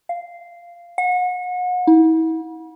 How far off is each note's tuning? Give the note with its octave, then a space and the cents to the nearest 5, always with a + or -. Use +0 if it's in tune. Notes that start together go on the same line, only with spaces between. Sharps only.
F5 -10
F#5 -35
E4 -40